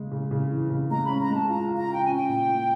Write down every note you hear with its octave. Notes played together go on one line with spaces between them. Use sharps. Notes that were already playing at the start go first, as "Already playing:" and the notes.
Already playing: C#3 G#3
C#3
C#3
E3
C#3
G#3 A#5
C#4 B5
A#5
G#3 A5
F4 A#5
F4
A#5
F4 G5
C#4 G#5
G5
A#2
A#2